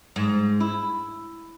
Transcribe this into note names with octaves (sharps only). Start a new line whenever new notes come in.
G#2
E4